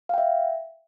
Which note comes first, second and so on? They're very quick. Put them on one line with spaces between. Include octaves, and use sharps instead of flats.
F5 G5 E5